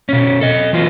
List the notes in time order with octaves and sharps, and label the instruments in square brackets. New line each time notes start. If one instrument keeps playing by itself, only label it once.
[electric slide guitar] B2 C#4
A4 D#5
E3 F4 F#4 B4